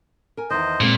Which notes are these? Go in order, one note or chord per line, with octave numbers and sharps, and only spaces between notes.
A#4 G#5
E2 D#3 C5 D#5
A#2 G#3 B3 C4